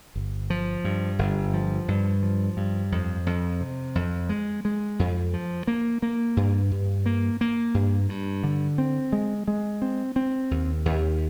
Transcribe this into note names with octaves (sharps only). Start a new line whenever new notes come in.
G1
F3
G2
G1
F3
G2
F3
G2
F2
F2
C3
F2
G#3
G#3
F2
F3
A#3
A#3
G2
G2
A#3
A#3
G2
G2
D3
C4
G#3
G#3
C4
C4
D#2
D#2